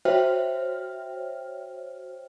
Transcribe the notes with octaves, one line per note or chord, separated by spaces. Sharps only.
F#4 C5 C#5 E5 G5 F6